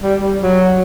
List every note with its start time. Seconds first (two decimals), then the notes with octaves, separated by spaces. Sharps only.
0.03 G3
0.43 F#3